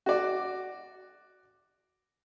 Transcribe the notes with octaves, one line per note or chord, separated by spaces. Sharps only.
F#4 D5